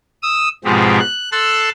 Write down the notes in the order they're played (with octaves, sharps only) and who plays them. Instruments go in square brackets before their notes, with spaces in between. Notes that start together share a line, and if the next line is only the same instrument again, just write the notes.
[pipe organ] D#6 E6
G#2 B2 F3 G#3 C4 G4
F#6
A4 C6 E6 F#6 A6